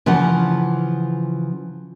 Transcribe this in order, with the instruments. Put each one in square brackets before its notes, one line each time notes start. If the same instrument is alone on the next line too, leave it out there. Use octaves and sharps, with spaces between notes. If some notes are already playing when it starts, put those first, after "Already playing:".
[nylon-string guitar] C#3 E3 F3 F4 F#5